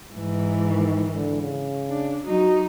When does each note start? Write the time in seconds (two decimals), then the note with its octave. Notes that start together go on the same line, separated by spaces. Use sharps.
0.14 G#2 E3
0.69 D#3
1.10 D3
1.42 C#3
1.90 D4
2.25 F#3 D#4 F#4